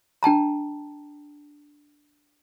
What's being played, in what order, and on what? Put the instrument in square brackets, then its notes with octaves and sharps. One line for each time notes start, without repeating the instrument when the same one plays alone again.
[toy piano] D4 G5 A5 A#5